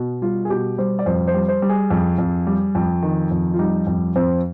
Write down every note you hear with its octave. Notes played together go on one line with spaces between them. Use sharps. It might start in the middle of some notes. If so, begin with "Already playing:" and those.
Already playing: B2
G3 F4
G#4
B2 G4
G3 C5
D5
F2 C5
C5
G3
C5
G3
G#4
F2
F2
G3
F2
D#3
F2
F4
G3 D#4
F2
F2 C4